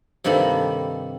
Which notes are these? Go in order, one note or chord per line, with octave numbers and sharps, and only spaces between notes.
G2 C3 D#3 A#3 A4 B5